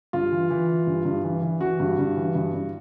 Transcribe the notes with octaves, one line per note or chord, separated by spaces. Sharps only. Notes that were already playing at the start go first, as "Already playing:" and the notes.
G2 F4
E3
E3
E3
G2
G2
E3
E3
E3 F#4
G2
G2
E3
G2
G2